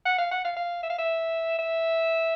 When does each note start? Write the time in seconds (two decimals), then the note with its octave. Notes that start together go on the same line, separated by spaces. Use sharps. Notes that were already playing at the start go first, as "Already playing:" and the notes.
0.06 F#5
0.18 F5
0.31 F#5
0.44 F5
0.56 F5
0.83 E5
0.90 F5
0.98 E5
1.59 E5